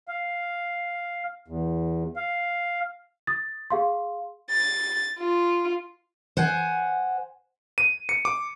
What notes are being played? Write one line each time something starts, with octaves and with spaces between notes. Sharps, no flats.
F5
E2
F5
D#6 A6
G#4 F5 C6
A6
F4
C5 F#5 G#5
D#7
C#7
D6